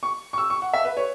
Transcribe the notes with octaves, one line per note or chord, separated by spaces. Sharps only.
C#6
C#6
E6
C#6
F#5
E5
B4
C#5